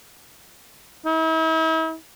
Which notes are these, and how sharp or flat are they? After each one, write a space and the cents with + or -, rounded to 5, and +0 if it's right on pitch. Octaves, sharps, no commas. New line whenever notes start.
E4 -45